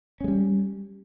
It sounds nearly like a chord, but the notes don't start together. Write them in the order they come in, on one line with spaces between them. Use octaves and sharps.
C#4 G#3 G3